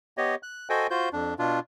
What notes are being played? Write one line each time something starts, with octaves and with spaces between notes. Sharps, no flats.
B3 G4 C#5 D#5
F#6
F#4 A4 C5 D#5 G5 G#5
F4 F#4 C5 G6
F2 D4
B2 D4 F4